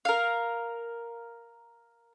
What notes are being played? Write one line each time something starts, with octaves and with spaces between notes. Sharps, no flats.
A#4 F5